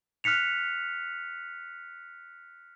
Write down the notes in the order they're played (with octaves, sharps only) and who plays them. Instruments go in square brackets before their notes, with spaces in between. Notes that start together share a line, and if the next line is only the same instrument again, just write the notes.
[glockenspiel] F6 F#6 B6 C#7 F7